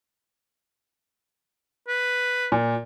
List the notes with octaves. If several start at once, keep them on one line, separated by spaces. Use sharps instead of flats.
B4
A#2